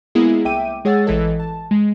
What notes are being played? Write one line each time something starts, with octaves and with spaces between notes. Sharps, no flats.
G#3 A#3 B3 E4 G#4
C2 E5 G5 D6 D#7
G#3 G#4 C#5 F#5 E6 A6
A1 E3 A4 D#5
A5
G#3